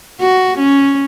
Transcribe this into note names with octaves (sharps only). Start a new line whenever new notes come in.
F#4
C#4